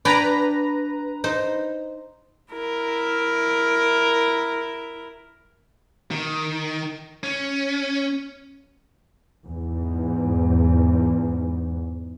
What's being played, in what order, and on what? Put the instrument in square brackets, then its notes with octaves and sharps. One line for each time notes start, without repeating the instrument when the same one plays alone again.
[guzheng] D4 G5 G#5 [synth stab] B4 A#5
[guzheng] D#4 C5
[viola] E4 A#4
[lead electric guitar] D#3
C#4
[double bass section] E2 G#2